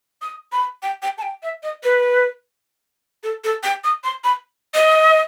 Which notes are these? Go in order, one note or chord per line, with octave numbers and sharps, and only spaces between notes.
D#6
B5
G5
G5
A5
G5
E5
D#5
B4
A4
A4
G5
D#6
C6
B5
D#5